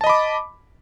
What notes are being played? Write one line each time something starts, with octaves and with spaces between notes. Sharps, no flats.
D#5 A5 B5 D6